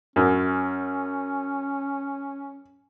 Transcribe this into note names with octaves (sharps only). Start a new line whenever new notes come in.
F#2 C#4